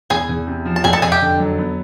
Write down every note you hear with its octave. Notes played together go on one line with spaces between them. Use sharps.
E2 G#4 G#5
E2
C3
F3
A5
F2 G#4 G#5
A4 A5
F2 G#4 G#5
G4 G5
D3
F#3
B3